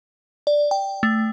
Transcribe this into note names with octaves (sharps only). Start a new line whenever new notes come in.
D5
G5
A3